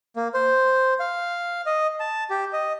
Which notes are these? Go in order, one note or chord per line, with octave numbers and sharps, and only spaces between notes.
A#3
C5
F5
D#5
A5
G4
D#5